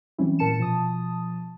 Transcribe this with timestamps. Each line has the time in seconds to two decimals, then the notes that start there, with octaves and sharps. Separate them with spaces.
0.18 E3 F#3 G3 C4 C#4 E4
0.39 A#2 A#4 A5 C#7 E7
0.58 B2 F3 A5 D#6